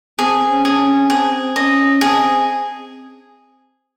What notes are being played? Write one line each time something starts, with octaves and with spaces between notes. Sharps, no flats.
C4 G#4
C#4
G#4
C#4
C4 G#4
C#4 D#5
C4 G#4